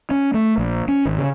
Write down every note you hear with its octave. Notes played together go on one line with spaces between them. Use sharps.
C#4
A3
A#1
C#4
G#1
C#3